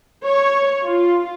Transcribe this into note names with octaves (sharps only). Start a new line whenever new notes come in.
C#5
F4